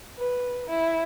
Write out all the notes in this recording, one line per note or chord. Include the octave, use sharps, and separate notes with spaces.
B4
E4